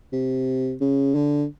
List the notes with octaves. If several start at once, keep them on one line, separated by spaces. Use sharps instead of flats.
C3
C#3
D3